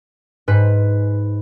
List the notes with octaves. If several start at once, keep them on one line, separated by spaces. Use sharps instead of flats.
G#2 B4